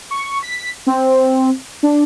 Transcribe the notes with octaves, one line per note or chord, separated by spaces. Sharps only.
C#6
B6
C4
D4